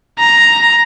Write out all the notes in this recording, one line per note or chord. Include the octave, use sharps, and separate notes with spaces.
A#5